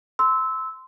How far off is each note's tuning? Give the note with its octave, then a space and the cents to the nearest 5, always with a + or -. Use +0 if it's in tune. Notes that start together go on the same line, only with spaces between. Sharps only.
C6 -15 E6 -15